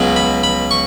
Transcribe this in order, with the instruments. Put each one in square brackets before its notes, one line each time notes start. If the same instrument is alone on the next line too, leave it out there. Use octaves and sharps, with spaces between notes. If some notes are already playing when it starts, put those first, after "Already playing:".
Already playing: [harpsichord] C#2 B2 F#3
B5
B5
C#6